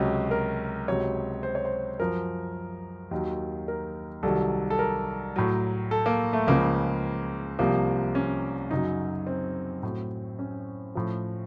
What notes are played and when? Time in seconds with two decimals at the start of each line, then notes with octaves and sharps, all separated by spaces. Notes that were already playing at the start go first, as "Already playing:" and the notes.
Already playing: C#2 C3 F#3 C#4
0.31 A#4
0.88 C#2 C3 F#3 C#5
1.43 C5
1.55 C#5
1.65 C5
1.99 F#2 F3 A#4
3.11 D#2 D#3 F#3
3.68 A#4
4.23 C2 C3 D#3 F#3 A4
4.70 A4
4.79 A#4
5.36 A2 F#3
5.91 A4
6.06 A#3
6.33 A3
6.47 C#2 C#3 F3 A#3
7.59 C2 C3 F3 A#3
8.15 C#4
8.71 F#2 C#3 F#3 D#4
9.27 C4
9.83 A2 F#3
10.39 C#4
10.95 A2 F3